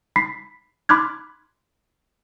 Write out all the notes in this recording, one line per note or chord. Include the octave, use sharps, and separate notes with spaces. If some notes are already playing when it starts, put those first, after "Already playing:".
B5 B6 C7
B5 C6 D6 F6 F#6 G#6